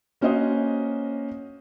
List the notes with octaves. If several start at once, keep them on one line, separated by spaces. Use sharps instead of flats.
A#3 C#4 F#4 C5 D#5